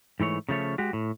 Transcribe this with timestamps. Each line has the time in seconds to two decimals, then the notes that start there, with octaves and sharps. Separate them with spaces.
0.20 G#2 E3 A3 C#5
0.49 C#3 F3 A3 C#5
0.78 G#3 F#4 G4
0.93 A2